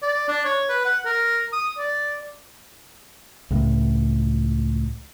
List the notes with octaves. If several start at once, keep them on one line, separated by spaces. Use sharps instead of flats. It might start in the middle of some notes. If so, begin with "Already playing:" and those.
D5
D4
C#5
B4
F#5
A#4
D#6
D5
C#2 A2